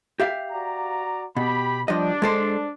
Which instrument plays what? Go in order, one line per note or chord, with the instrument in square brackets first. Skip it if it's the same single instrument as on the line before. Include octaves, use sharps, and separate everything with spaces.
[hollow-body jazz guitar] G4 E5 F5
[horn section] F#4 D5 A#5
[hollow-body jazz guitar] B2 [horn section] G4 B5
[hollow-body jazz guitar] F3 G3 D#5 [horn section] D4
[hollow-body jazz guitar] G#3 A4 C5